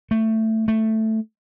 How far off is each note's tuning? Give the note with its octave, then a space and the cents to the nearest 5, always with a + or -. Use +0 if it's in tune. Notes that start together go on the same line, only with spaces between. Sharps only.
A3 +10
A3 +5